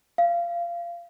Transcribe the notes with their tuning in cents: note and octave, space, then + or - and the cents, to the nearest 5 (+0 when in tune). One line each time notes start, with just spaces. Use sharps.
F5 -20